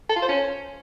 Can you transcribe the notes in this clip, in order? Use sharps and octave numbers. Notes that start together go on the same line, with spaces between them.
A4
F4
C5
C#4